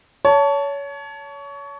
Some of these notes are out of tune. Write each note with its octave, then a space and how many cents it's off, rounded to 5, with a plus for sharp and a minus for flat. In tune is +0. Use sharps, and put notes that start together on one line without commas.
C#5 +25 A5 +0